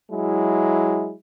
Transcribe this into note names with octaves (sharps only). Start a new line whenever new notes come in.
F#3 G#3 E4